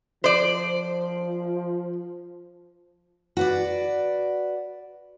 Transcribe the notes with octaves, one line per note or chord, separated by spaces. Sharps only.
F3 C5 D5
F#4 B4 D5